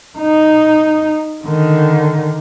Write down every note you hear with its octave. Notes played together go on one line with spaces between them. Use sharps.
D#4
D3 D#3